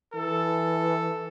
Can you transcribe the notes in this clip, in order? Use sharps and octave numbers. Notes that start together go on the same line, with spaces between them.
E3 A4